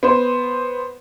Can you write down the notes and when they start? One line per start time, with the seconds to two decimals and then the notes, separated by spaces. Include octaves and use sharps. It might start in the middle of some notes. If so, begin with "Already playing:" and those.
0.03 B3 C5